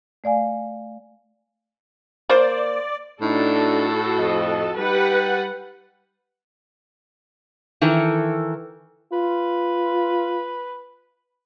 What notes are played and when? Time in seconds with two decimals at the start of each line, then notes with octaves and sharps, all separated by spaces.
0.24 A3 D5 F5 G#5
2.29 A#3 C5 D5
3.21 A2 D4 D#4 F#4 A4
4.18 F2 D#5
4.78 G3 D#4 G4 B4 F#5
7.81 D#3 E3 A4
9.13 F4 B4